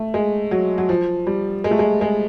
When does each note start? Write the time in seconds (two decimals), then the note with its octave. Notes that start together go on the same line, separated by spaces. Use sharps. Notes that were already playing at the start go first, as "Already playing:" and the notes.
Already playing: A3
0.14 G#3
0.51 F#3
0.78 F#3
0.89 F3
1.27 G3
1.64 G#3
1.71 A3
1.79 G#3
2.01 G#3